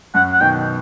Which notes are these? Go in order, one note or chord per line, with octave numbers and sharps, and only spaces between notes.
F#2 F#5
F#5
B2 D#3 G5